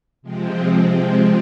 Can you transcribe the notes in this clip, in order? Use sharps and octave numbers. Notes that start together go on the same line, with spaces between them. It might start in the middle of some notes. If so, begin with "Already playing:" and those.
C3 F3 G#3 C4